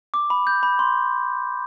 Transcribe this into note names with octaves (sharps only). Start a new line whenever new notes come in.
D6
B5
G6
B5
C6